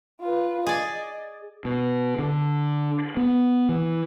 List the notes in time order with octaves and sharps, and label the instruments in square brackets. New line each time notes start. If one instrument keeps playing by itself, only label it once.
[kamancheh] F4 B4
[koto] G#4 D5 [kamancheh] D#5
[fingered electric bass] B2
D3
B3
E3